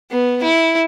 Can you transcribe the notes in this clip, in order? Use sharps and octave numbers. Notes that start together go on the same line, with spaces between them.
B3
E4